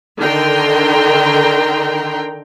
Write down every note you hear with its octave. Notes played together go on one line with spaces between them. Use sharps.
D3 D#3 G5 A#5 C6